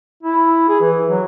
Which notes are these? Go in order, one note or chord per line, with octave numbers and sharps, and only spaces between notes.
E4
G#4
E3
F#3